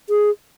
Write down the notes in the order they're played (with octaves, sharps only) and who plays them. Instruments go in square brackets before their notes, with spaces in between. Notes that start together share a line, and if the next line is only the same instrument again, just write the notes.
[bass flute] G#4